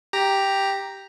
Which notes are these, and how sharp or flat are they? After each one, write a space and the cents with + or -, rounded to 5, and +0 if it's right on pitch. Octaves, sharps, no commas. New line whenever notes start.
G4 +0 A#5 +0